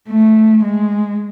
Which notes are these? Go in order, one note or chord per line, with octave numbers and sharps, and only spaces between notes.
A3
G#3